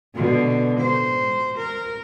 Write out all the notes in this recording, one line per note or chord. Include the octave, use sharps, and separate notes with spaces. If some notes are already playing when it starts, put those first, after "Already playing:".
B2 D3
C5
A#4